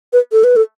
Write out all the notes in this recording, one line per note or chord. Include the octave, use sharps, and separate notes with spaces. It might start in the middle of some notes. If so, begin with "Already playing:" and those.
B4
A4
B4
A4